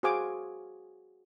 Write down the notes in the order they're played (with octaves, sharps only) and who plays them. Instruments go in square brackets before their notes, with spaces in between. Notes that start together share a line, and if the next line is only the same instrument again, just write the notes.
[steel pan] F#4 G#4 C5 F5 G#5 D6